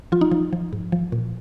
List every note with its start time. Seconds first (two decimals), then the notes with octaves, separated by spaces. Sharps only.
0.12 F3 F4
0.21 D#4
0.32 F3
0.53 F3
0.73 G#2
0.92 F3
1.12 A#2